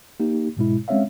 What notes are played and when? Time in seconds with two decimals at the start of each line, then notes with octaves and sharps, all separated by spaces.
0.20 A#3 D#4 G4
0.57 G#2 B2 G#3 E4
0.88 G#3 C4 C#4 C#5 E5 F5